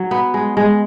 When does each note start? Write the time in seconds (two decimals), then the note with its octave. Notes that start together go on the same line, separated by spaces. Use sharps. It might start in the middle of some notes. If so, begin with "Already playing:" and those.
Already playing: F#3
0.11 B3
0.34 G#3
0.57 G#3